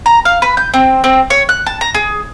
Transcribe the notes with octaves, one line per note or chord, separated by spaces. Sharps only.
A#5
F5
B4
G6
C4
C4
C#5
F#6
A5
A#5
G#4